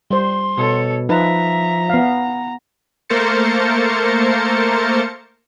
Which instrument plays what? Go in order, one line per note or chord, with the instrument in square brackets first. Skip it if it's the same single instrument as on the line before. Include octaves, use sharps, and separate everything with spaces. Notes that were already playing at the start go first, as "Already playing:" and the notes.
[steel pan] G3 C5 [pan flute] C6
[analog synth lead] B2 [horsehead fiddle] A4 C#5
[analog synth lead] F3 [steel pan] D#4 B4 [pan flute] E5 [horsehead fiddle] A#5
[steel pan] B3 F5
[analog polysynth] A3 A#3 A#4 C5 A6 C#7